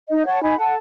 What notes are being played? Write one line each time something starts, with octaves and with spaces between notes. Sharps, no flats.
D#4 D#5
C#5 F#5 A5
D#4 G#5 B5
A4 F#5 A5